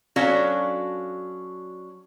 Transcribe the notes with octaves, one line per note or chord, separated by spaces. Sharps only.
F#3 C#4 D4 F#4 A4 F5